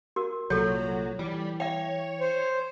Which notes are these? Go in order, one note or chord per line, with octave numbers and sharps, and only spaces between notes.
F#4 A#4
C2 A#2 F#3 A4 C#5
E3 G3
C#5 E5 G5
C5